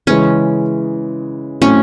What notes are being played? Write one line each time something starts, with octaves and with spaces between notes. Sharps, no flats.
C#3 E3 G#3 C#4
A2 F#3 A3 C4 C#4 E4